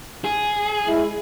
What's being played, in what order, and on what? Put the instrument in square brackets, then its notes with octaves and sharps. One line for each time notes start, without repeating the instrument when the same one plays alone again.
[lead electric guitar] G#4
[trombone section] G#3 E4